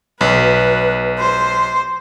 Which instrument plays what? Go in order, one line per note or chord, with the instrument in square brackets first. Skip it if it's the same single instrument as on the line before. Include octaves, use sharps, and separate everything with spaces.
[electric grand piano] B1 [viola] B4
[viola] C5